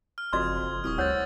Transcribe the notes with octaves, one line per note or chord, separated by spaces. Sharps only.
F6
F#1 F2 F#4 D#5 C6 D#6 G#6
F#1
D#1 C2 C#6 D#6 F6
D2 C5 C#5 F#5 E6 A6